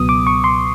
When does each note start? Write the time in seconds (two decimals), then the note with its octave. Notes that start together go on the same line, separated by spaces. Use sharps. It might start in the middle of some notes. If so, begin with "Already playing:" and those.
Already playing: C#2 B2 F#3 B3 D#6
0.09 D6
0.27 C#6
0.44 C6